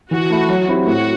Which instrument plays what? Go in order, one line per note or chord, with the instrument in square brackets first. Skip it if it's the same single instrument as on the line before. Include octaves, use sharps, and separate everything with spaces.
[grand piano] E3 [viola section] F#4
[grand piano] A3 E4
F#3
C4 E4 G4 C5
[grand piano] A2 [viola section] F#4